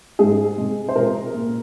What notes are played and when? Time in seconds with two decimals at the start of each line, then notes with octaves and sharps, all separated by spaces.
0.19 G#2 G#3 G#4
0.58 C3 G#3
0.89 C5
0.96 C3 F3 G#3 A#4
1.34 A#2 A#3